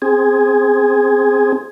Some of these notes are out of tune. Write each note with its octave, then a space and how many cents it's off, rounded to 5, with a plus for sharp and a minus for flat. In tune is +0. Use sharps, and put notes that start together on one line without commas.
C4 +0 G#4 +0